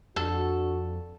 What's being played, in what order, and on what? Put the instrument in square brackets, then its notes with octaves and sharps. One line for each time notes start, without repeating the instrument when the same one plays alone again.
[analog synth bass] F2 [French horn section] D4 F#4 [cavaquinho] A4